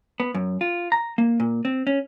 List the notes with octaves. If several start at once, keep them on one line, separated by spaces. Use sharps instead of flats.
B3
F#2
F4
A#5
A#3
A#2
C4
C#4